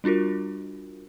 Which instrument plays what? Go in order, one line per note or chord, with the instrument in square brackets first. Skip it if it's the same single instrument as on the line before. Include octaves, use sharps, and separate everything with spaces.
[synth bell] G3 D4 F4 F#4 A#4